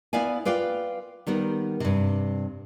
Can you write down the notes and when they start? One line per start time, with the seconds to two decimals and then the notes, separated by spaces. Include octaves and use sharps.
0.13 B3 E4 D5 F5 G#5
0.45 F4 B4 D5 F5 G5
1.27 D#3 G3 B3 A#4
1.80 G2 C3